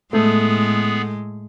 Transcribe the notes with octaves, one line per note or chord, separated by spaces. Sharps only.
A2 G#3 A3 B3 G#4